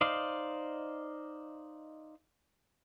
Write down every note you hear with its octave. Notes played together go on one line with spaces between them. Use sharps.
D#4 C5 D5 D#5 F5